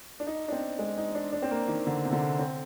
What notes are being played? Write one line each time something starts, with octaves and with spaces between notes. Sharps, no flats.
D4
D#4
D4
C4
G#3
D#4
D4
D4
C4
A#3
D#3
D3
C3
D3
C4